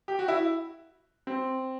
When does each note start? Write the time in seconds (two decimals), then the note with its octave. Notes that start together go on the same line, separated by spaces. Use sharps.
0.08 G4
0.19 F#4
0.28 E4
1.27 C4